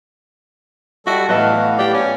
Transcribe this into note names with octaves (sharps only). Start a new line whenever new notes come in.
G3 F#4 A4 D#5 E5 G5
A2 E3 B3 B4 D#5 F5 A5
G4 D5
C#4